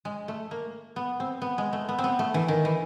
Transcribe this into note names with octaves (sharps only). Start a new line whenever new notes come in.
G#3
A3
A#3
B3
C4
B3
G#3
A3
B3
C4
B3
A3
E3
D#3
E3